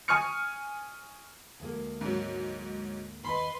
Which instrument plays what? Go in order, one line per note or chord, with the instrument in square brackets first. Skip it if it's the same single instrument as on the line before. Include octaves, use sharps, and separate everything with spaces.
[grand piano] G#5 C#6 D#6 F6 C#7
[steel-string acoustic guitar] D2 G#3 A#3
[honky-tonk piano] G#2 F#3
[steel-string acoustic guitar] D#2 D#5 [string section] B4 C6 [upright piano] B5